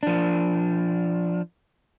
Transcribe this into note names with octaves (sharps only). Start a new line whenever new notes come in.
F3 D4